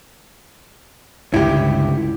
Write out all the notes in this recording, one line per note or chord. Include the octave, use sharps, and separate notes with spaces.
C#2 G2 D3 E4 G4